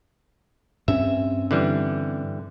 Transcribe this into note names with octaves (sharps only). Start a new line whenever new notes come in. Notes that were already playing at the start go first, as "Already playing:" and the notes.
G2 C4 C#4 E5
D3 E3 G3